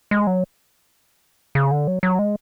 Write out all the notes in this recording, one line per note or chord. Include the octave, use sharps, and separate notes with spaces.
G#3
F#3
C#3
D3
F#3
F#3
G#3